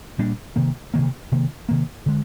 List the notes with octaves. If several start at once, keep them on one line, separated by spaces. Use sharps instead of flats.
A#2 G3 A#3 D4
C3 D#3 A#3
C3 D#3 A#3
C3 D#3 A#3
C3 D#3 A#3
D3 G#3